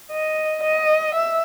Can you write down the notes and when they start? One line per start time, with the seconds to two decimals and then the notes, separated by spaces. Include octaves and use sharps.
0.12 D#5
0.63 D#5
1.14 E5